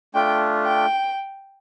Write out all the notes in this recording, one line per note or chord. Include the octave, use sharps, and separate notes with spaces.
A3 D4 F4 G5
G5